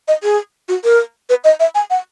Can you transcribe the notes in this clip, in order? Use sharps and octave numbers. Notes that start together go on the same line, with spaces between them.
D#5
G#4
F#4
A#4
B4
D#5
E5
G#5
F#5